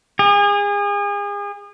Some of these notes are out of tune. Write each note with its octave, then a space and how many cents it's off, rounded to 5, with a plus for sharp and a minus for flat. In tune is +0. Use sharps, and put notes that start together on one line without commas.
G#4 -35